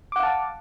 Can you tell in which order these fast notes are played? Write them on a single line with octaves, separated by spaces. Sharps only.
D6 F#5 F5 A5